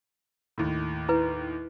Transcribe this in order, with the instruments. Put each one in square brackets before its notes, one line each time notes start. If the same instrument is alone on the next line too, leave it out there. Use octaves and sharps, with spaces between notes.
[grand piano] D#2 A2
[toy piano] E4 B4